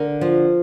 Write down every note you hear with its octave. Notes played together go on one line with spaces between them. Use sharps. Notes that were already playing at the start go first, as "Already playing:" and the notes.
Already playing: D3 A#4
F3